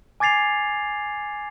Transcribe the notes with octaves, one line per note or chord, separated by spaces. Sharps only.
G#5 D6 G#6 A6 C7 F7